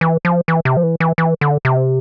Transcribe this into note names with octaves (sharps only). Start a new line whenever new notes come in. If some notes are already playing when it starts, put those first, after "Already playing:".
E3
F3
E3
C3
F3
E3
E3
E3
D3
C3